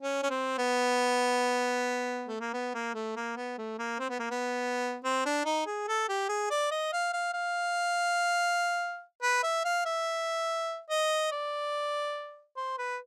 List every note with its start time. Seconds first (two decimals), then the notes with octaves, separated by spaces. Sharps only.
0.02 C#4
0.23 C#4
0.30 C4
0.58 B3
2.28 A3
2.40 A#3
2.53 B3
2.74 A#3
2.94 A3
3.16 A#3
3.37 B3
3.58 A3
3.79 A#3
3.99 C4
4.10 B3
4.19 A#3
4.31 B3
5.04 C4
5.26 D4
5.45 D#4
5.66 G#4
5.88 A4
6.09 G4
6.29 G#4
6.50 D5
6.71 D#5
6.93 F5
7.13 F5
7.33 F5
9.22 B4
9.43 E5
9.65 F5
9.85 E5
10.90 D#5
11.32 D5
12.57 C5
12.78 B4